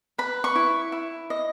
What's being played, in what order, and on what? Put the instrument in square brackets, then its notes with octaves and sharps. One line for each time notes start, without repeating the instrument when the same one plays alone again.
[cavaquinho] B4 B5
C#6
E4
E4
D#5